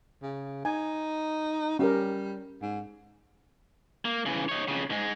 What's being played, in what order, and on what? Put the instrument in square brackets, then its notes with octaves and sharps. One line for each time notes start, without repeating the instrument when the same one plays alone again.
[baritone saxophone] C#3
[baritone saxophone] D#4 [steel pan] G#5
[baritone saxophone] G3 [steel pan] C#4 G4 A#4
[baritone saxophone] G#2
[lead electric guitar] A#3
C#3 E3
D#4 C#5
F2 C#3
G#2 G#3